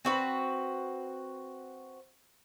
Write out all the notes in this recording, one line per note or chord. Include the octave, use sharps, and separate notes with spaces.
C4 F#4 B4